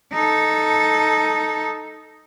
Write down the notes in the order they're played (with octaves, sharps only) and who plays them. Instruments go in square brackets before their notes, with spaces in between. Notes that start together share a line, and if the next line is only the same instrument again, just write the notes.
[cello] D#4 A4